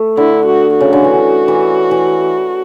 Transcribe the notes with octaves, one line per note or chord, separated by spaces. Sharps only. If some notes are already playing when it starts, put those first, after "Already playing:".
Already playing: A3
D3 E4
F#4
C#3 F#4
D3
E3
E3
E3